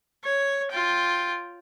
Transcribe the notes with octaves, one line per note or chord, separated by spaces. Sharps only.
C#5
F4 G5